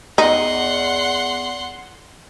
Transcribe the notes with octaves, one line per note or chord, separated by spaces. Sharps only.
E2 D#4 F#5 C6